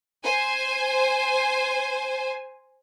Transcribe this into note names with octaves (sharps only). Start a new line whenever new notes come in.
C5 G#5